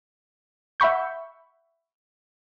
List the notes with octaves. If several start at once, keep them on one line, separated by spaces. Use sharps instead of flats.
E5 F#5 B5 C#6 G6